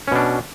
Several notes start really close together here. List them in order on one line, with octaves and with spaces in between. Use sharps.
C#4 B2 D4